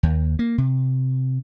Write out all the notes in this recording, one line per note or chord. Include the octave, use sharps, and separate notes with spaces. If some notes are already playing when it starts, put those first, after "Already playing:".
D#2
A#3
C3